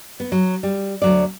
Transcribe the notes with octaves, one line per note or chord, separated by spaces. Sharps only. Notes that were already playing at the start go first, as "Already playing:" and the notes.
B3
F#3
G3
D2 F#3 D5